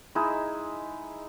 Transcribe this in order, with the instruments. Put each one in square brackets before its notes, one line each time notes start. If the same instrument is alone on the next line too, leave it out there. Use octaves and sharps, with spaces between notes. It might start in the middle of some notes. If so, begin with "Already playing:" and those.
[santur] G#3 D#4 E4 E6